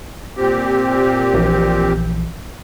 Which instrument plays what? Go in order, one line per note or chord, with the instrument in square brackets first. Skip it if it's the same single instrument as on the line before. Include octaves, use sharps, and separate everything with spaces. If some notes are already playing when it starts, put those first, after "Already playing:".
[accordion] A#2 C4 G4
[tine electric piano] A#1 E3